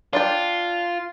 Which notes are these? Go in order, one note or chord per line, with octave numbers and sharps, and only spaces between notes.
D4 F4 D5 G5